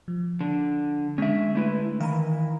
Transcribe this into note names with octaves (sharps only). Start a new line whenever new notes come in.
F3
D3
D3 G#3 C#4 D4 E5
A3 E4 B4
D#3 E3 F5 A#5 B5